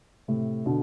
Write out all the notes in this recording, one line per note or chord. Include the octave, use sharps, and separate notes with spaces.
A2 C3
B2 D3